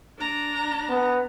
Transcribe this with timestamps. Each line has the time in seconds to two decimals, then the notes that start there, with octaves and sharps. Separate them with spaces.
0.18 D4 A#5
0.89 B3